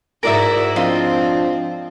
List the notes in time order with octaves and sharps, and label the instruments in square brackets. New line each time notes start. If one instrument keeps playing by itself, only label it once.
[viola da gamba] G#2 E4 F#4 [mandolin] A#4 D5 E5
[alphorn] F3 [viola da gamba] C4 [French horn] D4 [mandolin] F4 D#5